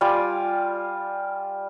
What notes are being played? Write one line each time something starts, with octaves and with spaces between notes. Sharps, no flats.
G3 F4 G#5 D6